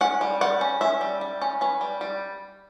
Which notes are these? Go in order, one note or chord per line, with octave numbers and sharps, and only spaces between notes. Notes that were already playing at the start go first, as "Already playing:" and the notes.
C#4 F#5
G3
G3 F#5
C#4
C#4 E5
G3
G3
C#4
C#4 B4
G3
G3